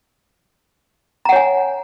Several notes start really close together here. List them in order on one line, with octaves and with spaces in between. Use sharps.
A#5 F#5 C#5 G#5